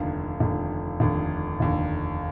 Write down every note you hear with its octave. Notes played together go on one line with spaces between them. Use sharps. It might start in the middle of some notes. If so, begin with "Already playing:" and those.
Already playing: F1 D#2 D3
F1 D#2 D3
F1 D#2 D3
F1 D#2 D3